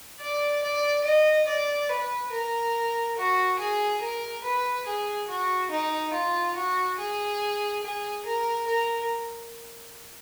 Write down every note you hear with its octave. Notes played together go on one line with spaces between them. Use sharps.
D5
D5
D#5
D5
B4
A#4
F#4
G#4
A#4
B4
G#4
F#4
D#4
F4
F#4
G#4
G#4
A#4
A#4